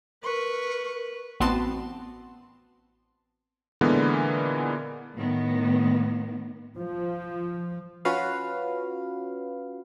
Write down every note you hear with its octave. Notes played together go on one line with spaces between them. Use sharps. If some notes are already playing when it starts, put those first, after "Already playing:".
A#4 B4 C#6
A1 B3 C4 F#4 A5 C6
A#2 D3 E3 G#3 B3 A#4
A2 D#3 B3
F3
C#4 F4 F#4 B4 F5